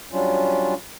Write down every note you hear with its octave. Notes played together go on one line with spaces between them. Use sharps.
F#3 G3 C#4 D4 F4